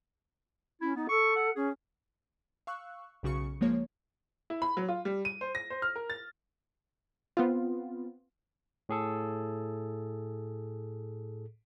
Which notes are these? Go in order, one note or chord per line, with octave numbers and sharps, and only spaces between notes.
C#4 E4
B3 D#4
A4 C#6
F#5
C#4 G#4
F5 C#6 E6 F#6
B1 C#3 F#4 C#6 C#7
F3 G#3 A#3 C#5
E4
B5
F#3
F4
G3
D#7
C5
A#6
C5
F6
A#4
A6
B3 C4 F4
A2 G#4 A4